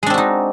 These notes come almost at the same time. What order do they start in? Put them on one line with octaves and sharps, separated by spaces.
G#3 D4 C4 F#4 D#4